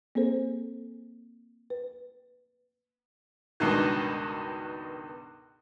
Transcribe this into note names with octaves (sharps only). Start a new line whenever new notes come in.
A#3 C4 G#4 A4 C5
B4
C#2 G2 B2 D#3